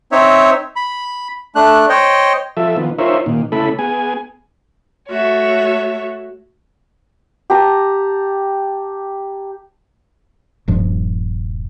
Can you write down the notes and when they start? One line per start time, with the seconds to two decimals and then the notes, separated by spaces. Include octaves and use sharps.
0.12 C4 D#4 C#5 E5
0.76 B5
1.55 A3 D4 F#6
1.89 C5 C#5 D#5 G5
2.57 F3 A4 E5
2.77 D#3 F3 B3
2.99 D#4 F4 A#4 C5 C#5 E5
3.26 A#2 D#3
3.52 C#3 A3 E4 A4 B5
3.79 B3 G#4 G#5
5.10 A3 F#4 C#5 E5
7.50 G4 A5 A#5
10.68 D#1 G2 F3